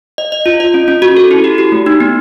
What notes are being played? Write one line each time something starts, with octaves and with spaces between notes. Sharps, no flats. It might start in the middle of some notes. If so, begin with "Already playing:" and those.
D#5
D#5
F4
D#5
C#4
C#4
F#4
A4
E4
G4
G4
A3
D#4
B3